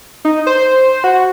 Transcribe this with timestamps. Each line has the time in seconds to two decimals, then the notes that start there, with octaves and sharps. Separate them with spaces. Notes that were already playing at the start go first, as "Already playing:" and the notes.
0.25 D#4
0.47 C5
1.04 F#4